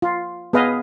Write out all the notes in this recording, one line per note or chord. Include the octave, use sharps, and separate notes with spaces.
F4
B3 G#4 B4 D#5 F5